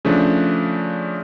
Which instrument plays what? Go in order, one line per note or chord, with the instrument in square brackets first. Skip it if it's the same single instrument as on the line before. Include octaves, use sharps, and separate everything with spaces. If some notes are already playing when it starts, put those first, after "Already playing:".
[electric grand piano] C#3 F3 A3 D4